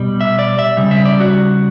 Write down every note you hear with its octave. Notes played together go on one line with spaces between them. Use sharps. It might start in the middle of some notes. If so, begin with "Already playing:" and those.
Already playing: B2 G3
E5
D5
E5
C#3 G3
E5
D5
F#4